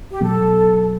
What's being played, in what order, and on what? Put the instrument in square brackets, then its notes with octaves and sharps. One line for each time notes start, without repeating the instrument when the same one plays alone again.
[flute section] G4
[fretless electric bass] B2 F#3 B3 [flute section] A4